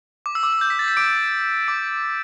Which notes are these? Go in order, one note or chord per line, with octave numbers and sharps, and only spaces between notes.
D6
E6
D6
E6
G6
B6
A6
B6
D6 D7
D6 D7